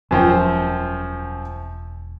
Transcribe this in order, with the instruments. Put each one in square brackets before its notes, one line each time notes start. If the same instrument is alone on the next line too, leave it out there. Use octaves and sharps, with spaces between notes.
[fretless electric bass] E1 [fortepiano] F#2 F3 G5